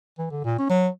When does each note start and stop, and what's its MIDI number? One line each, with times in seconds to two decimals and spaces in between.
0.19 0.28 52
0.31 0.43 50
0.45 0.56 46
0.59 0.68 61
0.70 0.89 54